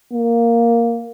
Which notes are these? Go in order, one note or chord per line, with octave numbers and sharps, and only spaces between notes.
A#3